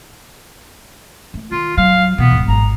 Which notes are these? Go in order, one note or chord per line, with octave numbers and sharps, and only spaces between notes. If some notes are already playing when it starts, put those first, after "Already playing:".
A3
D#3 F4
F#3 F5
B2 E3 B3
D1 G#2
G#1 A#5